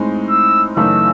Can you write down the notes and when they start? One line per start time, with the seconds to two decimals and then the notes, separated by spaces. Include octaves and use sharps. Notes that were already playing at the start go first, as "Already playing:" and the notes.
Already playing: A2 G#3 C4 D#4
0.29 E6
0.76 F#2 C#3 E3 A3 D#4 E6